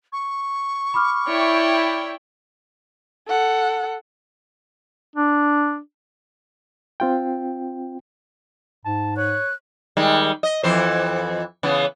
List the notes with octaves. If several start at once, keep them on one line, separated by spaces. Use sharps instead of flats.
C#6
B5 D6 F6
E4 C#5 D5 G5
A4 F#5
D4
C4 F4 G5
G#2 A5
C#5 F#6
D#3 G3 G#3
D#5
F2 E3 C5
C#3 E3 B3